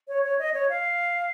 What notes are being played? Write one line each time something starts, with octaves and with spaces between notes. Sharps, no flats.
C#5
C#5
D#5
C#5
F5